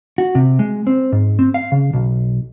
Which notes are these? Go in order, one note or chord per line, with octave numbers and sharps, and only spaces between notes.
F#4
C3
G#3
C4
G#2
C4
F5
C#3
B1